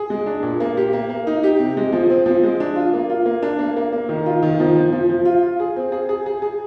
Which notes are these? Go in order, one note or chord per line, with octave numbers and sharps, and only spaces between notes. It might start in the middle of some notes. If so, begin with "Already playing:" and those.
Already playing: G#4
G#3
D4
A#2
A#3
G4
A#3
A#3
D#4
G4
C3
G#3
F3
C4
F3
G#3
D4
F4
A#3
F4
A#3
D4
A#3
A#3
A#3
D#3
F4
D#3
F3
F3
F3
F3
F4
F4
G#4
C4
G#4
G#4
G#4
G#4